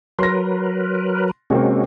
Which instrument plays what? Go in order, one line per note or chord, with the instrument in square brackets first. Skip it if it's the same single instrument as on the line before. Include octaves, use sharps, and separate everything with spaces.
[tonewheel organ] F#3 A#4 B4 [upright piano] C6 A#6
[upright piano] C3 A#3 C4 [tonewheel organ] G#3 C#4 F#4